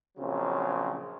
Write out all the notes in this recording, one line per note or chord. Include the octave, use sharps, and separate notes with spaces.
A#1 C#3 F#3 C4